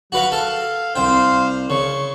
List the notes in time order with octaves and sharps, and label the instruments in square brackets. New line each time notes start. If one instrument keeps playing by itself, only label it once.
[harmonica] F#3 [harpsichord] F#4 B4 F5
[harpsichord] A4 [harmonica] F5
[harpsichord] C2 G5 [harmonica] C5 F5
[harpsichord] C#3 [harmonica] C#6